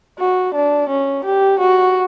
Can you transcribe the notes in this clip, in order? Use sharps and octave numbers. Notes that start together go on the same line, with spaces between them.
F#4
D4
C#4
G4
F#4